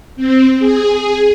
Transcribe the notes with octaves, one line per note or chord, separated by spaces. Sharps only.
C4
G#4